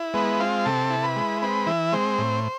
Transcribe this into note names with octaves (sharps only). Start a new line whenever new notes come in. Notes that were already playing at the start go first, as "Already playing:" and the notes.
Already playing: E4
G#3 B3 B4
C4 F4 F5
C3 A4 A5
E4
B4 B5
G#3
C4 B4 B5
E3 E4 E5
G#3 C4 C5
A2